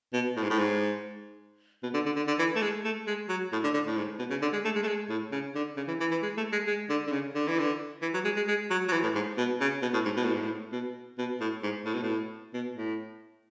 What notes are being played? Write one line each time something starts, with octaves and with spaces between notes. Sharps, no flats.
B2
A2
G#2
A2
G#2
B2
D3
D3
D3
D3
E3
A3
G#3
A3
G#3
F#3
A2
D3
D3
A2
G#2
B2
C#3
D3
G#3
A3
G#3
A3
G#3
A2
C#3
D3
C#3
E3
E3
E3
G#3
A3
G#3
G#3
D3
D3
C#3
D3
E3
D3
E3
F#3
G#3
G#3
G#3
F#3
F#3
E3
A2
G#2
B2
C#3
B2
A2
G#2
B2
A2
G#2
A2
B2
B2
A2
G#2
A2
B2
A2
B2
A2